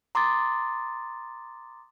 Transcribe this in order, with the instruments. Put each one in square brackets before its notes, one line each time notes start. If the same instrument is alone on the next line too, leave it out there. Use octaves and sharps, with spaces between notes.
[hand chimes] A#5 C6 D6 D#6 A6